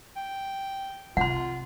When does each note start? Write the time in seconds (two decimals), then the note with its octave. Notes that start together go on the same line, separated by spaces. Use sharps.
0.17 G5
1.17 C3 F4 F#5 C6